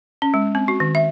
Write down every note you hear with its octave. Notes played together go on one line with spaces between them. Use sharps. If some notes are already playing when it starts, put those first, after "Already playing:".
C#4
G#3
C4
F#4
D#3
E5